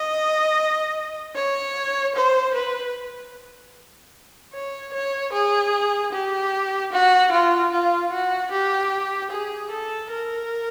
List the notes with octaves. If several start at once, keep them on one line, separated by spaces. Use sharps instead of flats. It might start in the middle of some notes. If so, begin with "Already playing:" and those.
Already playing: D#5
C#5
C5
B4
C#5
C#5
G#4
G4
F#4
F4
F4
F#4
G4
G#4
A4
A#4